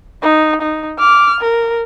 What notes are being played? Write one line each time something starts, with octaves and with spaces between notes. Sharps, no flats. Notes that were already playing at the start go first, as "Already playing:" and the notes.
D#4
D#4
D6 F6
A#4